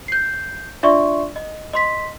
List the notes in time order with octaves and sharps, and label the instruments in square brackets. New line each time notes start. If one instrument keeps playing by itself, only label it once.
[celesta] G6 C7
D4 F4 D5 E5 C6 C#6
D#5
D#5 C6 B6